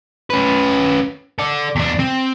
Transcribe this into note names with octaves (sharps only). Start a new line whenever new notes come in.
C#4 B4
A4 D5
E2 D4
C4